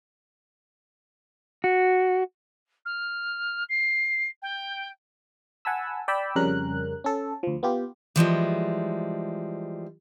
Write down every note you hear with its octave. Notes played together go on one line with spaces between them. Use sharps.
F#4
F6
C7
G5
F#5 G#5 A5 B5 E6
D5 G5 B5 E6
F2 C#3 G3 C#4 A#4 F#6
C#4 A4
D2 F3
B3 F4 G4
E3 F3 G3 G#3